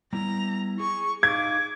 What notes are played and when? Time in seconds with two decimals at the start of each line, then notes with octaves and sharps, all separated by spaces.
0.13 G3 B3 E4 A#5
0.80 G#4 C#6
1.23 D#4 G#4 F5 D6 G#6